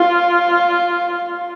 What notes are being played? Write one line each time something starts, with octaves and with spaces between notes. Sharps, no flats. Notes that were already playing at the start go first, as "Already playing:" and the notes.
Already playing: F4